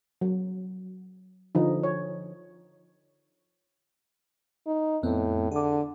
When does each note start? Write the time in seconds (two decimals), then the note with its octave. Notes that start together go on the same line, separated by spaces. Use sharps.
0.21 F#3
1.55 D3 F3 D#4
1.83 C#5
4.67 D#4
5.03 F2 A2 B3 C4
5.52 D3 G#4 D6